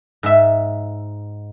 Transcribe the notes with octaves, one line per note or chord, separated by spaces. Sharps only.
G#2 E5